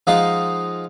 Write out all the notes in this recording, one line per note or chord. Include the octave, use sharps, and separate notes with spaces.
F3 G#3 D#4 F4 D#5 F#5